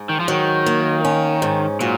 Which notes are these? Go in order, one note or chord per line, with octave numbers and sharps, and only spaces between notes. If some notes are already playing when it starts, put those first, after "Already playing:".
Already playing: G#2
D#3
F3
D#3 F#3
A#3
C#4
G#2
A#2 F#3